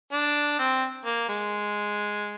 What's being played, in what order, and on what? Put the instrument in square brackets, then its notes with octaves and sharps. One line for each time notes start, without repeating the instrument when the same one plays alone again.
[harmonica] D4
C4
A#3
G#3